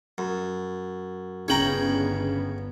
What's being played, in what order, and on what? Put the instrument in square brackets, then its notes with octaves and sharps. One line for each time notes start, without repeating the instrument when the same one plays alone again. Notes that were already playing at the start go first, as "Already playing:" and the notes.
[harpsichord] F#2
[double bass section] G1 B3 [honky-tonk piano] C#3 F#7 [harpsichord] C#5 G5 A#5